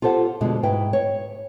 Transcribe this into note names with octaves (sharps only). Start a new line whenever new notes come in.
F4 G4 A4 C5 F#5
F2 B2 D3 G#3
G#2 E4 B4 G5
C#5